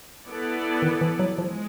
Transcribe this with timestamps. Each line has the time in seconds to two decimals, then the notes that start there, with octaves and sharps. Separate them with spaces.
0.26 B3 E4 A4 D5
0.82 D#3
1.01 E3
1.19 F#3
1.38 F3 G#3